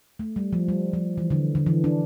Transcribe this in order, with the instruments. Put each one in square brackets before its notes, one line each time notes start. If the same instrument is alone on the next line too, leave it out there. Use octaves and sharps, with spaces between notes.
[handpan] A3
G3
F3
G3
F3
E3
D3
D3
E3
D4